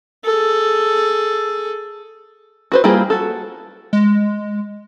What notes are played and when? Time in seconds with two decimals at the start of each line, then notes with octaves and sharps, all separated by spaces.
0.25 G#4 A4
2.72 F#4 B4 C5
2.84 G3 A#3 E4 F4 G#4
3.10 F#4 A4
3.93 G#3